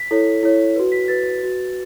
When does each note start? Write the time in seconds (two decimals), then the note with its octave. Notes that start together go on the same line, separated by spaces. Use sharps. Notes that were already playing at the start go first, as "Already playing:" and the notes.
Already playing: B6
0.11 E4 A4 C#5
0.43 E4 A4 C#5
0.76 F#4 B4
0.92 B6
1.08 F#4 B4 A6
1.42 F#4 B4